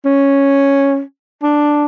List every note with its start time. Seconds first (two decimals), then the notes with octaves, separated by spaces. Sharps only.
0.05 C#4
1.43 D4